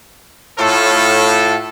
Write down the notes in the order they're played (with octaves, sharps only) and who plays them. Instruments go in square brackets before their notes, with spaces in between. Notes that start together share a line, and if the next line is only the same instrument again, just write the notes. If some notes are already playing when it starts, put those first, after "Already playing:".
[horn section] A2 F4 A4